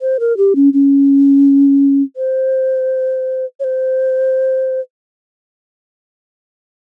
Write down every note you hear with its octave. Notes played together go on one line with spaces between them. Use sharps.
C5
A#4
G4
C#4
C#4
C5
C#5
C5